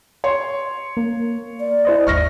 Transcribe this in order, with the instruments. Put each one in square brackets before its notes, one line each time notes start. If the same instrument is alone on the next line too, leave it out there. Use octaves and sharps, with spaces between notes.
[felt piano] C#5 C6
[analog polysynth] A#3
[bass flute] D5
[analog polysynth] E4 C5 D#5
[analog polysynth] G#1 D#2 [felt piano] C#6 F6 A#6